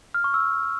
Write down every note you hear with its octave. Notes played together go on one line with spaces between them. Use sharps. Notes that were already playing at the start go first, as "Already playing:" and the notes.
F6
C#6
E6